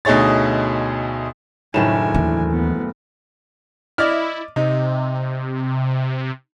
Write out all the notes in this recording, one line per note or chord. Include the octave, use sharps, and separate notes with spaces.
D2 B2 D#4 G#4 C#5 A6
F#1 A2 D#3 A3 D4 G#5 E7
D#2 E3
B3
E4 D5 D#5 F6
C3 D#4